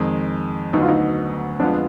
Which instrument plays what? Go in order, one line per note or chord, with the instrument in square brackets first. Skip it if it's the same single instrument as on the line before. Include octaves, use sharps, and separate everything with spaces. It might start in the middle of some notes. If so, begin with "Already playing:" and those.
Already playing: [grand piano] F2 D#3 G#3
[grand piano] D2 D3 F#3 B3 [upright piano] D#4
[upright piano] F4
D#4
[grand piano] F2 D3 G#3 B3 F4 [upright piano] D4